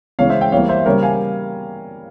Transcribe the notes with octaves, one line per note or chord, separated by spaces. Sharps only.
C#3 E3 G#3 C#5 F5
C5 E5
E5 G5
E3 G3 A#3 C#5 F5
C5 E5
E5
C#3 G3 A#3 A#4 C#5
F5 G#5